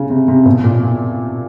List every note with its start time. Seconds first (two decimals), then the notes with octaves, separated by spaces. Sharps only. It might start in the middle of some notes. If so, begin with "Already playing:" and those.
Already playing: C#3
0.10 C3
0.28 C3
0.46 B2
0.64 A#2